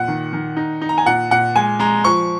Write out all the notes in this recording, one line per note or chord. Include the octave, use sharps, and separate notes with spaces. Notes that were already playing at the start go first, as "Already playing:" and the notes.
Already playing: A#2 F#5
D#3
D#3
D#4
D#4
A#5
G#5
A#2 F#5
A#2 F#5
G#3 G#5
G#3 A#5
F3 C#6